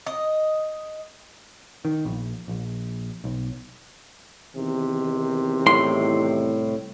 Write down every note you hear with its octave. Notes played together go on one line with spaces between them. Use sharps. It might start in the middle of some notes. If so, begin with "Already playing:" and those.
D#5
D#3
A#1
A#1
B1
E2 C3 D#3
C2 A2 C6